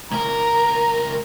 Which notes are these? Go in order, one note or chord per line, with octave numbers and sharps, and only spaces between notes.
C#2 A#4 A#5